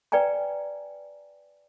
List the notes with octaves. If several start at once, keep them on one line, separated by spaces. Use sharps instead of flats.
B4 D5 G5 G#5 A#5